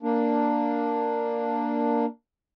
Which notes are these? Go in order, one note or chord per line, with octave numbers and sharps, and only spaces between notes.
A#3 D4